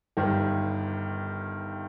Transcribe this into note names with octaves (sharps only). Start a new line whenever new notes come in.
G1 G2 D#3